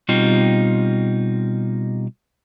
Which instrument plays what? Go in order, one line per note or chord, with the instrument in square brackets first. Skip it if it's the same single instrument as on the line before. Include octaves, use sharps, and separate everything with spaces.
[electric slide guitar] B2 G3 C4 D#4 F4 G4